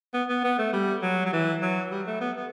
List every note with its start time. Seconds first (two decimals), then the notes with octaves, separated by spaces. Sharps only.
0.13 B3
0.29 B3
0.44 B3
0.58 A3
0.73 G3
1.02 F#3
1.26 F#3
1.33 E3
1.62 F#3
1.91 G3
2.07 A3
2.21 B3
2.36 B3